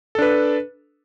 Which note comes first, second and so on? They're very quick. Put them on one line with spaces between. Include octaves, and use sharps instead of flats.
A4 D4 B4